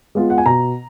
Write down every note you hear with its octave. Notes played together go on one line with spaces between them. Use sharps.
G#3 B3 F4
F#5
G#5
B2 A#5